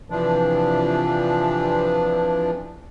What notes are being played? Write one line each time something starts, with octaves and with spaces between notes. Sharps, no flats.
C3 E3 F3 D4